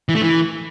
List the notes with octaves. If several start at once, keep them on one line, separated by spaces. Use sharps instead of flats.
E3
A3
E3